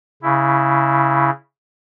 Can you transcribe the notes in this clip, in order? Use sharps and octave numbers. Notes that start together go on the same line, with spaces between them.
C#3 E4